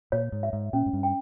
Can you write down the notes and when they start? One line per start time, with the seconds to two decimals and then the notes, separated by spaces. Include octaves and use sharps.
0.12 A#2 C#5
0.32 G#2
0.43 E5
0.53 G#2
0.73 A#2 C#4
0.86 G#2
0.93 G2
1.03 G5